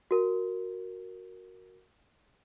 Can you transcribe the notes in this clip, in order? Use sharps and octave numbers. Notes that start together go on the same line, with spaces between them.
F#4 A#4